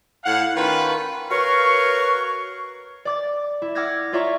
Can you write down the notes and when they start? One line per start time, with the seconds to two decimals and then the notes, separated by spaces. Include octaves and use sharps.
0.24 A2 F5 F#5
0.56 D#3 C#4 F4 B4
1.31 F#4 A#4 B4 C#5 F5 C#6
3.05 D5 D6 A6
3.62 E4
3.75 F#5 D6 E6 F6 G#6 A#6
4.13 F4 C#5 D5 E5 A#5 C#6